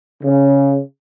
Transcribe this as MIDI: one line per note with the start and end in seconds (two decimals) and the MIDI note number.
0.22 0.78 49